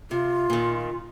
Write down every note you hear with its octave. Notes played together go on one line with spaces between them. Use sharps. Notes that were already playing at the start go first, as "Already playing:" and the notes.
C3 F4
A#2 D#3